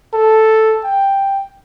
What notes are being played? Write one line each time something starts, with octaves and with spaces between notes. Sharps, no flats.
A4
G5